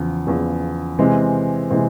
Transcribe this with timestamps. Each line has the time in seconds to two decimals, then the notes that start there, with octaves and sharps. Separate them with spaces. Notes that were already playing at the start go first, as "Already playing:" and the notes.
Already playing: E2 C#3 F3
0.27 E2 C#3 F3
0.98 C3 E3 G#3 C4
1.71 C3 E3 G#3 C4